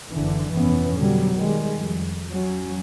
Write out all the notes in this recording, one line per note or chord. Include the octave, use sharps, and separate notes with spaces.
F#1 D3 E3
F1 G2 E3 B3 C#4
B2 D3 F#3 G3
D#3 G3 G#3
F2
F#3 C#4